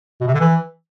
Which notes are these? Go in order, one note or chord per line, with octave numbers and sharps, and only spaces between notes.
B2
C3
D3
E3